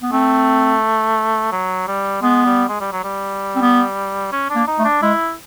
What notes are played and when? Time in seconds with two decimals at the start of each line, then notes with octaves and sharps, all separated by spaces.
0.03 B3
0.12 A3 C4
1.52 F#3
1.87 G3
2.22 G#3 B3
2.45 G3
2.69 G#3
2.80 G3
2.92 F#3
3.04 G3
3.56 C4
3.62 B3
4.32 C#4
4.50 D4
4.56 A#3
4.67 D#4
4.79 A3
4.85 D4
5.02 G#3 E4